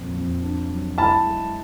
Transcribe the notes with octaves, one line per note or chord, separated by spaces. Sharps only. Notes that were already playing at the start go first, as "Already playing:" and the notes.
Already playing: F2 A#2
F2
D4
F#3
E4 A5 B5
G#3